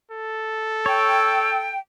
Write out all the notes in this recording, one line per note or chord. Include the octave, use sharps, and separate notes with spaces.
A4
C#5 G5 E6